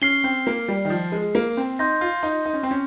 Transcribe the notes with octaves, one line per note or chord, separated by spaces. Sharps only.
C#4 F6 C7 G7
C4
A#3
G3
D#3
F3
G#3
A#3
C4
D#4 C6 G6 A#6
F4
D#4
D#4
C#4
C4
C#4